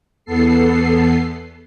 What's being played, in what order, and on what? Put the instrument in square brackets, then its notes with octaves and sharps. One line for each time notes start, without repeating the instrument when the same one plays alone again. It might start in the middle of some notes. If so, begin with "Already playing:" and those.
[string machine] E2 B3 A4 C7